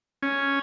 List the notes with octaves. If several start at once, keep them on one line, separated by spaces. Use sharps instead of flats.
C#4